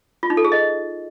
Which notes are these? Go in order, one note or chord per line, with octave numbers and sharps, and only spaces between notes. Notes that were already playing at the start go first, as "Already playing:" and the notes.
F4
D#4
A4
G#4
D#5